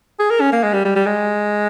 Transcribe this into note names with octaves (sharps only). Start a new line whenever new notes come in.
G#4
A#4
C#4
A#3
G#3
G3
G3
G3
G#3